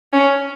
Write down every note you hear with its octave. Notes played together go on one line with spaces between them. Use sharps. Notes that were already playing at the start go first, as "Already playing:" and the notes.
C#4